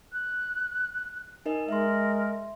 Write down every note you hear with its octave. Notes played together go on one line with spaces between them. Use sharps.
F#6
D#4 A#4 D#5 G#5
G#3 A#4 E5 C6